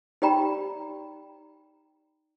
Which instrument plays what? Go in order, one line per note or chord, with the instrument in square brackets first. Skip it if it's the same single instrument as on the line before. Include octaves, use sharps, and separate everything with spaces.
[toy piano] D#4 G4 D5 G5 A#5 B5